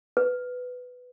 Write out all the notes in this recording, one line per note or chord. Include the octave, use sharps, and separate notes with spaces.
B4